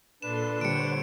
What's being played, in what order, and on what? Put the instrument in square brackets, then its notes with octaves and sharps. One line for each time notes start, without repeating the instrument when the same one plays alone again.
[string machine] A#2 A4 C6 [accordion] D4 B4 [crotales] E7
[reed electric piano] D3 G3 [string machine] C5 C#5 F#5 [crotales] C#7 D7